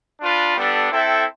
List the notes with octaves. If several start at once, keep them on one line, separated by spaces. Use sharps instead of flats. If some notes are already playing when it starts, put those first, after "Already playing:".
D4 F4 B4
G3 B3 D4 A4
C4 E4 A4 E5 G5